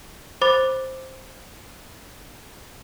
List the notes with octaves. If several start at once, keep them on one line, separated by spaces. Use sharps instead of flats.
C5 B5 D6 A6